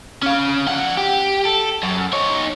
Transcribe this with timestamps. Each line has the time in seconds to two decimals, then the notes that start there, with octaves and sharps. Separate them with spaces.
0.23 C#4 F5
0.67 F3 F#5
0.97 G4
1.45 A4
1.83 F#2
2.13 D#4 C#5